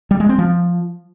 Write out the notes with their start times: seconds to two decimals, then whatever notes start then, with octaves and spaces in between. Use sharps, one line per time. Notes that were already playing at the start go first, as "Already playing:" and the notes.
0.11 G3
0.20 G#3
0.29 C4
0.38 F3